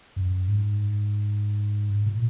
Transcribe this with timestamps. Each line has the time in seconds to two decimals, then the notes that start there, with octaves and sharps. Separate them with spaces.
0.16 F#2
0.48 G#2
2.06 A#2